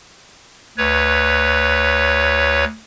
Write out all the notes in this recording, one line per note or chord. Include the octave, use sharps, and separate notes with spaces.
D2 B4 C#5